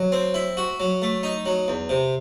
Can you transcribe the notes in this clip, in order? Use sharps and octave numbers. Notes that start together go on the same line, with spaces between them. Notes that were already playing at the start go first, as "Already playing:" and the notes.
Already playing: F#3
C4
E4
F#4
F#3
A3
D#4
F#3
E2
C3